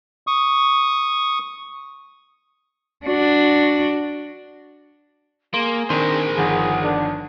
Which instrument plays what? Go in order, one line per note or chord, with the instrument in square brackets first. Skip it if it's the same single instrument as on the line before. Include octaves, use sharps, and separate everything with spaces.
[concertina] C#6 D#6
[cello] D4 F#4
[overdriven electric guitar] A#3 [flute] G#4 [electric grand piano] C6
[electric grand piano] D#3 C4 D4 [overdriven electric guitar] A#4 C5
[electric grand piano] G1 D#3 F3 [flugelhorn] G#4 [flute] F#5
[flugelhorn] D4